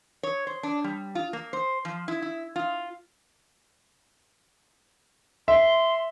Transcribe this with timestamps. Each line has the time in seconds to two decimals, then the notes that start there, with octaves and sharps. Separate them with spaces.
0.23 C#5
0.47 C5
0.63 D4
0.84 G3
1.15 F4
1.33 A#3
1.53 C5
1.85 F3
2.08 E4
2.22 E4
2.56 F4
5.48 E5 C6